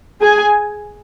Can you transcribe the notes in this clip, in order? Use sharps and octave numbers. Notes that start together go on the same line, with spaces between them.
G#4 G#5